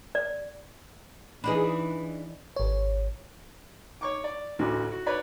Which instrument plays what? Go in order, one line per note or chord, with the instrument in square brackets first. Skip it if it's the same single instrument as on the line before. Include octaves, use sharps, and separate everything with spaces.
[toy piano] D5
[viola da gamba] E3 [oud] D4 D#4 G#4 [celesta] B4 B5
[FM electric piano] G#1 C#5
[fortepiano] C#5 C#6 D6
D5
A1 D2 D3 F#4
F#4
B4 C#5 D5 B5